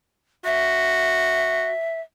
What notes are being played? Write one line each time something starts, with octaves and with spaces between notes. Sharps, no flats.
F#4 E5